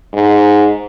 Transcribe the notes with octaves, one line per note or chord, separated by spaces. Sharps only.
G#2